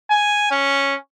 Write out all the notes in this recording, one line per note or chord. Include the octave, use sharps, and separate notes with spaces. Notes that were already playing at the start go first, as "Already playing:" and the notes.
G#5
C#4